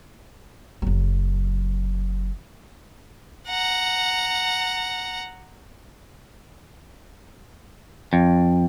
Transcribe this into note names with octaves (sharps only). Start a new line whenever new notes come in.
F#1 F#3
F#5 A#5
F2